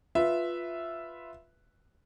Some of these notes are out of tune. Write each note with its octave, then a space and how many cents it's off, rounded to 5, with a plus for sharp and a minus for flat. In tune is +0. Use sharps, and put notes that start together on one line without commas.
F4 +0 B4 +0 E5 +0